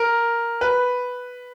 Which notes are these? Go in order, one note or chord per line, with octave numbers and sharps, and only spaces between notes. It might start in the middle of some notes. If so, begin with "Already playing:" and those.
Already playing: A#4
B4